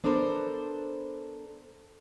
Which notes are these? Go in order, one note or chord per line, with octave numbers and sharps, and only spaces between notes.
B3 D4 A4 A#4 C5